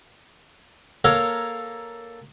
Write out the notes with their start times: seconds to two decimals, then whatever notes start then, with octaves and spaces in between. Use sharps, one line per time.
1.04 A#3 A4 A#4 C#5 F5